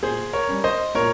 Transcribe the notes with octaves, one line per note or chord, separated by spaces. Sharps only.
A#2 G#4 C5
A#4 C#5
G3 C#4
C5 D#5
A#2 A#4 C#5